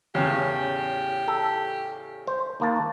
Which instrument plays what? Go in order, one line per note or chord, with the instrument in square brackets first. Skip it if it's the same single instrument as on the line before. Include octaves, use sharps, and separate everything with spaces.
[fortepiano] E2 A2 C#3 [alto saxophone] G4
[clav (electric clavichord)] A4
C5
D#2 A#3 A5